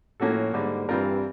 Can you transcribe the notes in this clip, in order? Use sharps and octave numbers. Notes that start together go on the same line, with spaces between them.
A2 F3 A#3 C#4 F#4 A4
G#2 D3 G3 A#3
G2 E3 G3 C4 F4 A#4